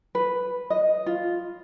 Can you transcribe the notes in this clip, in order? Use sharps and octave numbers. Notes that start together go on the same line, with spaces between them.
B4
D#5
F4